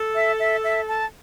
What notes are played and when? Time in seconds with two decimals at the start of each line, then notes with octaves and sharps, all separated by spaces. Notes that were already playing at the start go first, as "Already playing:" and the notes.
Already playing: A4
0.15 E5
0.40 E5
0.64 E5
0.88 A5